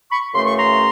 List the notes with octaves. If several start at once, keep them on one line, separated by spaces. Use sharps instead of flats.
B5 C#6
F#2 C#3 E3 A3 C6
C#6
A#5 C6